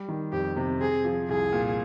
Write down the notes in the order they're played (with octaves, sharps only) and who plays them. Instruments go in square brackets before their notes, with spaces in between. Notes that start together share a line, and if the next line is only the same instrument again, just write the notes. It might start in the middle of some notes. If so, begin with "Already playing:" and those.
Already playing: [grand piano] G3
D#3
[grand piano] F2 [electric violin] G4
[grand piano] C3
[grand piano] C4 [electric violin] G#4
[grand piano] F3
[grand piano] C2 [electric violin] G#4
[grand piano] A#2